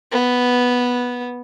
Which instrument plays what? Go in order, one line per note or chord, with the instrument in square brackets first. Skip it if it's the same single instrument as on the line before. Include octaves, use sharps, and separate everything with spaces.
[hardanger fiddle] B3